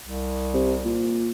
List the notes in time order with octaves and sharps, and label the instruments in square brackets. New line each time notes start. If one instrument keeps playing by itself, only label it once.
[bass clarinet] C2
[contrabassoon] C3
A#2